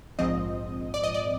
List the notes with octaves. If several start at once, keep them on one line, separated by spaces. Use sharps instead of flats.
A#1 G#2 F3 C4 D#5
D5
D#5
D5